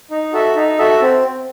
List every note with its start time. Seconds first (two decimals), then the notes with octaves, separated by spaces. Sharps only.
0.11 D#4
0.33 F#4 A4 E5
0.56 D#4
0.78 F#4 A4 E5
1.01 C4